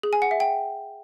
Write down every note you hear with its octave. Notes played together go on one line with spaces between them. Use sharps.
G#4
G#5
F#5
E5
G5